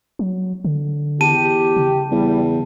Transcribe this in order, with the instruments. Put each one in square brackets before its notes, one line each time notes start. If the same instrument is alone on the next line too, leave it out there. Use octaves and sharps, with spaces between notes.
[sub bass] F#3
D3
[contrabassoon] E2 [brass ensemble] G4 [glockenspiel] A5 D#7
[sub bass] C#3
[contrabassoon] E2 [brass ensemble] G3